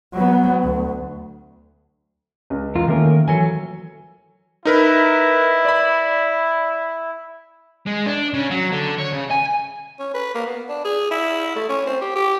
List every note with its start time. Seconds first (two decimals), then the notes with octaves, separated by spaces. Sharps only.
0.14 F#3 B3
0.63 D2
2.50 C#2
2.75 E2 F4 A#4
2.88 D#3 A3 A#3 C#4 A#4
3.28 E3 F#3 A4 G#5
4.65 D#4 E4 A#4 B4
5.65 D5 B5
7.86 G#3
8.06 D4
8.34 C#3
8.51 F#3
8.72 D3
8.99 C#5
9.13 C#3
9.31 G#5
9.99 C#4
10.14 B4
10.34 A#3
10.47 B3
10.69 D4
10.84 G#4
11.11 E4
11.55 A3
11.69 C#4
11.87 C4
12.01 G4
12.15 G4